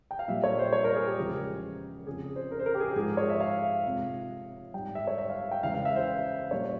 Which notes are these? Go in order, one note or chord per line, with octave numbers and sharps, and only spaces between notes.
G5
F5
A#2 G3 E5
C#5
C5
C#5
A#4
G#4
G4
E2 C#3 F3 G#3
F2 C#3 F3 G#4
C5
A#4
C5
A#4
G4
G#4
G4
G#2 F3 G#3 G#4
C#5
E5
F5
F2 C3 F3 G#3
G#2 G3 G5
E5
C#5
E5
F5
G5
E2 C#3 E3 G#3 F5
F5
E5
C5
A#2 G3 C#5